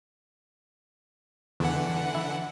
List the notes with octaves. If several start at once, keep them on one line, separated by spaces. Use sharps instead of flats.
E2 D3 E3 F#5
E4